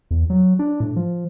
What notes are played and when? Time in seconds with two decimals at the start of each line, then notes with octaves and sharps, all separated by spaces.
0.11 E2
0.30 F#3
0.59 D4
0.80 A2
0.96 F3